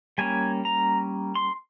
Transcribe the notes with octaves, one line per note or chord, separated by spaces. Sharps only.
G3 A#3 C#4 G#5
A#5
C6